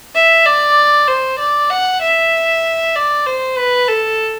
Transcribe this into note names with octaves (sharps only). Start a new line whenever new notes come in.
E5
D5
C5
D5
F#5
E5
D5
C5
B4
A4